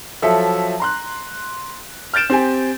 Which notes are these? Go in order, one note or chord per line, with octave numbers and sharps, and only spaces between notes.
F3 F#3 A4 E5
A#5 C6 F#6
F6 G6 A6 D7 E7
C4 G4 G#5